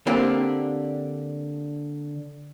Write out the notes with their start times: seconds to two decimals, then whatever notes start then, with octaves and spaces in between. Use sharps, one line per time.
0.07 D3 A#3 C4 D4 G4